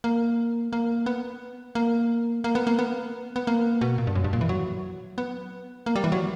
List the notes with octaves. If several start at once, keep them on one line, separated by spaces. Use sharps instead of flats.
A#3
A#3
B3
A#3
A#3
B3
A#3
B3
B3
A#3
B2
A#2
G2
F#2
G2
A#2
E3
F#3
B3
A#3
G3
E3
F#3